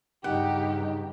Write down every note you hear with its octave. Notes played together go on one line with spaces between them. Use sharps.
G2 C#3 D#4 G4 F#5